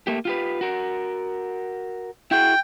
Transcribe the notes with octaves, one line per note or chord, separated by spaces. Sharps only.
A3 A#3 G4
F4 G4 B4
F#4 A#4
E4 F#4 G#4 G5